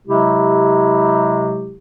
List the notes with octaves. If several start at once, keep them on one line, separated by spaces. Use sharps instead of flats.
C3 F#3 G#3 E4 G4